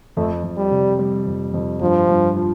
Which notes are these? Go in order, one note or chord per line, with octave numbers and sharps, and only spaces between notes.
F2 A3
F2
G3
C3
G3
F2
F2
G2 F3
G2
F3